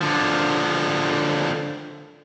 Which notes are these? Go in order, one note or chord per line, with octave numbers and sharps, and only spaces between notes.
D3 F3